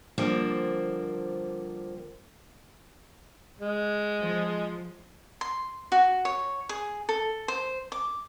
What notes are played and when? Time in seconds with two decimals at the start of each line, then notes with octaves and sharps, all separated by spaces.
0.18 D3 F3 G3 A#3 C4
3.60 G#3
4.21 F3
5.41 C6
5.92 F#4
6.25 C#5
6.69 G#4
7.09 A4
7.48 C5
7.92 D6